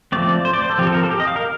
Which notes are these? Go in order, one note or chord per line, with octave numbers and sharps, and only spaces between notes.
F3 A3 C4 D5
C5
D5
C5
A4
F3 C4 G4
A4
A#4
A4
G4
D#5
F5
A#4